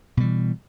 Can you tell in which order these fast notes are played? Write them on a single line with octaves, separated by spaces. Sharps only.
B2 G3 E3